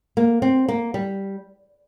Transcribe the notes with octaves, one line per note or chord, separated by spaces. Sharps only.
A#3
C4
A#3
G3